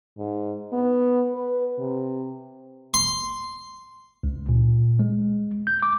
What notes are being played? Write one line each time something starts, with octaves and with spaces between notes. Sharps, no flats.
G#2
B3
B4
C3
C6
C#2
A#2
G#3
G6
D6